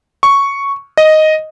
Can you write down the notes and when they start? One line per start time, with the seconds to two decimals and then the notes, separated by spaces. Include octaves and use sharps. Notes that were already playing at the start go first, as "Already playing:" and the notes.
0.23 C#6
0.97 D#5